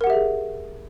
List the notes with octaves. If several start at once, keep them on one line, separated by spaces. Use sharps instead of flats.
G4 G#4 A#4 E5 F#5